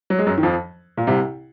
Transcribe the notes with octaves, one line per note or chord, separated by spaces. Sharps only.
F#3
G#3
F#2 F#3
D#3
F2 F3
A#2
C2 C3